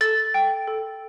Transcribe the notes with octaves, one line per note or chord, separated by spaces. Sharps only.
A4 A6
G5
A4